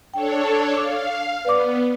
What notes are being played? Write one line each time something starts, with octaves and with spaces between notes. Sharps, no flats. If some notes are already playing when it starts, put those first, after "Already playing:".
D4 A4 C#5 G5
F5 D6
B3 B4 D5 D6